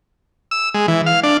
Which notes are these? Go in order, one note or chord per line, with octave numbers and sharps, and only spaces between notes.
E6
G#3
E3
F5
D4